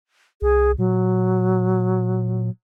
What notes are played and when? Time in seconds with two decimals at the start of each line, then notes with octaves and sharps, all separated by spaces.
0.42 C2 G#4
0.78 A#2 F#3